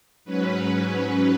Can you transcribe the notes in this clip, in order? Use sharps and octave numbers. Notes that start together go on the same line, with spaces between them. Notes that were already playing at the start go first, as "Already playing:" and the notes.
G#2 F#3 C#4 B4